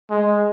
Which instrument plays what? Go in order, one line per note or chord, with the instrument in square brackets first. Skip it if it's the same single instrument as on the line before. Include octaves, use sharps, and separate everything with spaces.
[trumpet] G#3